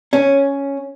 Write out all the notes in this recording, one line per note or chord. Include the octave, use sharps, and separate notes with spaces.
C#4